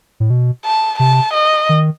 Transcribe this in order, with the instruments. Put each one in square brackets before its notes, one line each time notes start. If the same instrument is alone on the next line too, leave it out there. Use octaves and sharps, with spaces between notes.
[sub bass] A2
B2
[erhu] A5
[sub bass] C3 [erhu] A5
[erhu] D#5
[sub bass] D#3